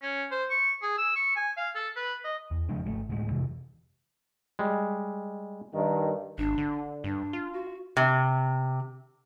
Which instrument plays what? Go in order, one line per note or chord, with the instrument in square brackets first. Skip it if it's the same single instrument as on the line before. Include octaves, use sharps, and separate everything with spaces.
[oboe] C#4
C5
C#6
G#4
E6
C#6
G#5
F5
A4
B4
D#5
[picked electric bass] E2
C#3 F3 G#3 D4
G#1 E3 A3
D1 D2 A2 G#3
F2 C3 E3
[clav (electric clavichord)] G3 G#3
[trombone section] G2 D#3
[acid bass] G#1 [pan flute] D4
[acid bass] D3
[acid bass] G2 [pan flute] D4
[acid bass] F4
[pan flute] F#4
[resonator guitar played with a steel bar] C3